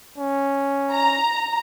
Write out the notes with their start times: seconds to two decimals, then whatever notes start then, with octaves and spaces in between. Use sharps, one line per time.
0.18 C#4
0.92 A#5